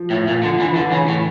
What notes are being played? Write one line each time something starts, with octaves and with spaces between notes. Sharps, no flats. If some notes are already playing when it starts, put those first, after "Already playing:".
Already playing: F3
A2
A#2
D3 F3
E3
D3 E3
C#3
A2